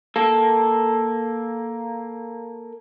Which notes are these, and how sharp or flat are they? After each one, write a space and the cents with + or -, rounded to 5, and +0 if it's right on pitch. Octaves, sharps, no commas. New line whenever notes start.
A#3 +0 A4 +0